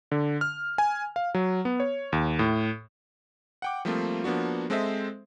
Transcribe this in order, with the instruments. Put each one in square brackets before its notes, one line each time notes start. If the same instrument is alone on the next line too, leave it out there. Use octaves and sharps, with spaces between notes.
[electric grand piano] D3
F6
G#5
F5
F#3
B3
C#5
D#2
A2
F#5 G5 D6
F3 G3 A3 A#3 C4 F4
F3 A#3 B3 D4 F#4
G#3 C4 A4 C5 D#5 E5